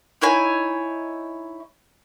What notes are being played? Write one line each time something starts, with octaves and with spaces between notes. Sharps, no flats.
D#4 E4 C#5 G#5